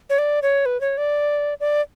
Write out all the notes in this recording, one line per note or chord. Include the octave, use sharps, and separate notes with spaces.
C#5
D5
C#5
B4
C#5
D5
D5